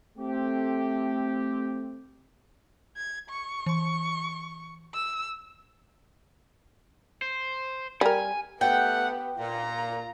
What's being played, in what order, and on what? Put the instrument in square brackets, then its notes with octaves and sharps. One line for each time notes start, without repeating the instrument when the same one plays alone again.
[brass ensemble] A3 C4 G4
[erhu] G#6
C#6
[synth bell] E3 C6
[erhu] E6
[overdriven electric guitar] C5
[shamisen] G3 A#4 [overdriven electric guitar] G#5
[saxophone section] A3 F#5 [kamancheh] B3 G4 [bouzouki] G5
[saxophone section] A#2 [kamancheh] F4 A#5